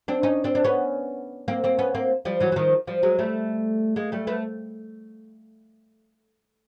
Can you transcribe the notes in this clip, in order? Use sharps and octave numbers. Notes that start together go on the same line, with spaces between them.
C4 D4
C#4 D#4
C4 D4
D4
B3 C#4
A#3 C4
A#3 C4
B3 C#4
A#3 C4
F3 G3
E3 F#3
F#3
D#3 F3
F3 G3
F#3 G#3
G3 A3
G#3 A#3
G3 A3
A3 B3